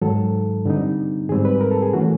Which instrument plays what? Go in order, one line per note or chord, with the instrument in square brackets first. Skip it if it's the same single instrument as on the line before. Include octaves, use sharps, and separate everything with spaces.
[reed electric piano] G#2 D#3 F#3 A4
G2 D3 G3 C4 D#4
G#2 D#3 G3 C4 G#4
B4
A#4
A4
G#4
A2 E3 A3 C#4 F#4